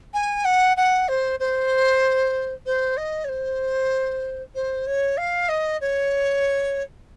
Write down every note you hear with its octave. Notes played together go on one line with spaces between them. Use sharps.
G#5
F#5
F#5
C5
C5
C5
D#5
C#5
C5
C5
C#5
F5
D#5
C#5